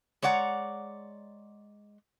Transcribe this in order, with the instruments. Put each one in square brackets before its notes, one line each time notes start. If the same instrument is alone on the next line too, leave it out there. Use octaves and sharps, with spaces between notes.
[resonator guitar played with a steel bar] G#3 C#5 D5 F#5 A#5